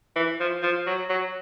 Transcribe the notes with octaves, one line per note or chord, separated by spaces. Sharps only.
E3
F3
F3
F#3
F#3